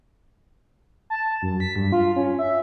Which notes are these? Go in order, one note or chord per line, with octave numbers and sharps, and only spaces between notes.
A5
F#2
B6
G2
F4
C#4
E5